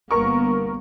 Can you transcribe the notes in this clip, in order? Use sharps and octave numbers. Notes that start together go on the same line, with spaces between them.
G1 A#3 B3 A#4 C#6